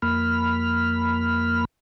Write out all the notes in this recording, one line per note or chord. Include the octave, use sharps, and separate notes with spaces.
F2 A#3 B5 F6